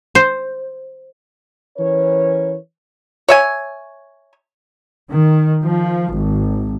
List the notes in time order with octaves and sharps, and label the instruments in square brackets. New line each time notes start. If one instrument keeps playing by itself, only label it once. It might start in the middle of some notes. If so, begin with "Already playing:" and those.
[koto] C5
[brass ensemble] E3 C#4 A#4 B4 C#5
[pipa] C#5 E5 G#5
[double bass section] D#3
F3
G#1